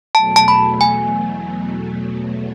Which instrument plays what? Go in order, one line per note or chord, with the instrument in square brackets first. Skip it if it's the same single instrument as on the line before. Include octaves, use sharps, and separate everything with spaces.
[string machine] E2 B2 F#3 A3 [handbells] A5
[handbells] A5
B5
G#5